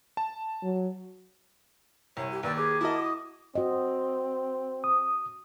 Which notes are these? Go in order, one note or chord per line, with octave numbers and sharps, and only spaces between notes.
A5
F#3
C2 C#5 G#5
G4
D#2 B4 D5 G5 E6
G#4 B4 D6
E4 F#4 A#4 D#5 A5 D#6
D#6
C4 F#4 D#5
D#6